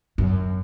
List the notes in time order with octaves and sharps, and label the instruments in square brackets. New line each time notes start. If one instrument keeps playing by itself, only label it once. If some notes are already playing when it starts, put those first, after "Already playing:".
[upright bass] F#2